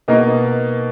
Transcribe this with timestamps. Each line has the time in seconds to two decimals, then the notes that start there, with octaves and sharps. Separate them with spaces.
0.08 B2 A#3 D#4 D#5